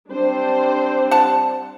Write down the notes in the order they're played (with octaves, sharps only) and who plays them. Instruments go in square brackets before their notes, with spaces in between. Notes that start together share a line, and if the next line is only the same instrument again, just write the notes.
[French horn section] G3 C4 [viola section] D4 C5
[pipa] F#5 A5